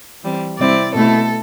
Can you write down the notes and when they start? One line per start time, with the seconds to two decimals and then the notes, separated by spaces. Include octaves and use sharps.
0.23 E3 G3 C4
0.58 C3 G3 C4 E4 D5
0.95 B2 A3 E4 A4